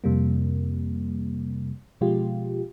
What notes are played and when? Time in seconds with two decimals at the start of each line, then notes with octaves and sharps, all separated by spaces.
0.04 F2 C3 G3 A#3
2.01 B2 F3 G#3 F4 G4